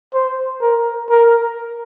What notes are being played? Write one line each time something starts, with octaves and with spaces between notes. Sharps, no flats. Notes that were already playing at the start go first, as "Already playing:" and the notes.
C5
A#4
A#4